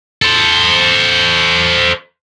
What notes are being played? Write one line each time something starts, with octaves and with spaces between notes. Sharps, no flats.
A4 C5